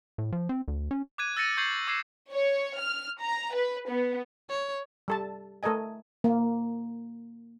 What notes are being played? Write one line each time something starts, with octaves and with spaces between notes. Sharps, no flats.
A2
F3
C4
D2
C#4
D6 F#6 G#6 D#7
E6 A6 A#6 C#7 D#7 F#7
C#6 G6 G#6 C7 D#7 F#7
D6 E6 G#6 C7 E7
C#5
F6
A#5
B4
B3
C#5
G3 A4 A5
A3 A4 A#4 D#5 G#5
A#3